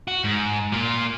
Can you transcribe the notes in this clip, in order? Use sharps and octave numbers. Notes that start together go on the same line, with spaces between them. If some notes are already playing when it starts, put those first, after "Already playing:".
F#4
G#2
A#2 F4